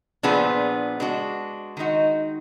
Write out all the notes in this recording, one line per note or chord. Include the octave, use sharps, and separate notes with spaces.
A#2 F3 B3 D4 G#4
G#3 D4 F#4
D#3 G#3 D#4 F#4